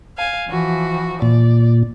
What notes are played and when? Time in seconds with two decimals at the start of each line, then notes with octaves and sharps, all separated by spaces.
0.17 F5 G#5
0.48 E3 F3 F#4
1.22 A#2 D5